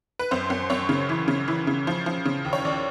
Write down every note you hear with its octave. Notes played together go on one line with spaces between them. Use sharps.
B4
F#2 C5
F#2
F#2 C#5
C#3
E3
C#3
E3
C#3
F3
F3
C#3
D#2
C#5
D#2 D5